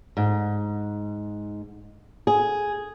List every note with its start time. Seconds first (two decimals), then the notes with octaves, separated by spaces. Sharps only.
0.17 G#2
2.27 G#4